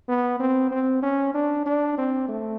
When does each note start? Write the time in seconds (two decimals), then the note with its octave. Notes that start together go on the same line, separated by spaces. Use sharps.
0.09 B3
0.40 C4
0.71 C4
1.03 C#4
1.34 D4
1.66 D4
1.98 C4
2.28 A3